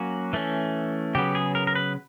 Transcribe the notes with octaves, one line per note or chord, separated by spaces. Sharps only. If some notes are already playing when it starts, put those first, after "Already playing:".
Already playing: F#3 A#3 C#4 F#4
E3 A3 C#4
C#3 F#3 B3 G4
G#4
A#4
A#4
B4